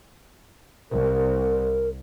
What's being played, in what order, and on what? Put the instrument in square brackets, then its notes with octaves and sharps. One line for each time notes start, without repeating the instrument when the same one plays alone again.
[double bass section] C2 [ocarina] A#4